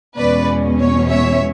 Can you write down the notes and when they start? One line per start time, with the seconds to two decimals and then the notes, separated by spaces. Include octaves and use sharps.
0.18 E2 B2 G#3 C#4 B4 D5
0.79 C#5
1.10 C#5 E5